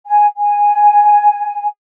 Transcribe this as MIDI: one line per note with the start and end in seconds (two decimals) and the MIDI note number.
0.08 0.26 80
0.36 1.66 80